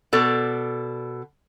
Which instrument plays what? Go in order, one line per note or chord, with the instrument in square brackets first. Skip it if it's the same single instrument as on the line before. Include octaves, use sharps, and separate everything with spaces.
[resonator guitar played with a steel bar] B2 A4 D5